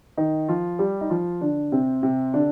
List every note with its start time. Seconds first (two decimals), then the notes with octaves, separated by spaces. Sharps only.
0.17 D#3 D#4
0.49 F3 F4
0.79 G3 G4
1.01 D#4
1.10 F3 F4
1.41 D3 D4
1.72 C3 C4
2.03 C3 C4
2.34 D3 D4